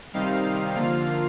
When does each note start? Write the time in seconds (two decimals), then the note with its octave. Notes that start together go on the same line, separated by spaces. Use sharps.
0.13 C3 D#3 G3 C4 D#4 F5
0.44 F5
0.75 D3 F3 A#3 F4 F5